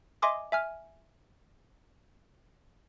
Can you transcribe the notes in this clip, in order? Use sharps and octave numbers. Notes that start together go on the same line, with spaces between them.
D#5 E5 G#5 C6 D6 D#6
E5 G#5 F6